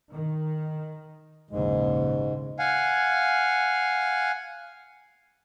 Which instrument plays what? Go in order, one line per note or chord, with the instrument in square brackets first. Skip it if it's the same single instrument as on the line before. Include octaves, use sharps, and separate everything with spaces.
[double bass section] D#3
[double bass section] A#1 D#2 C#3 [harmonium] G#2 G#3
[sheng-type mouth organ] F5 F#5 G#5